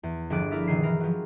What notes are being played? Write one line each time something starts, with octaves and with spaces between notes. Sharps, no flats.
E2
G1 F3 G#4 D5 F#6 D7
E4 A#4 D5 E5
G1 B2 D#3 G#4 C7
E3 A#4
F3 F#3